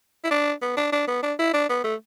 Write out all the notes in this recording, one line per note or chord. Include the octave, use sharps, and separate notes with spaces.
E4
D4
B3
D4
D4
B3
D4
E4
D4
B3
A3